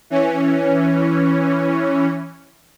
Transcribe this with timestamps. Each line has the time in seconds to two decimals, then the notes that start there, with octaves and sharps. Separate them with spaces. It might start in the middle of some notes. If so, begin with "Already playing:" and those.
0.10 E3 C#4